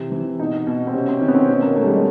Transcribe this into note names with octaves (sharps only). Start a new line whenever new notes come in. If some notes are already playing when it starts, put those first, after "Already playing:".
Already playing: C3 E3 E4
E3
B2 D#4
B2
C4
C3 C#4
C4
D#3 C#4
B3
C4
B2 C#4
A#3
B2 A3
G3
G#3